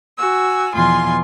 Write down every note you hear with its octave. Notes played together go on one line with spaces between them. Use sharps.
F#4 G#5 E6
E2 B2 F3 F4 G#5 C6